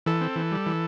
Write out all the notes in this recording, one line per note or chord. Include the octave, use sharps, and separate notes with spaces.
E3 A4
C4
E3
G3
E3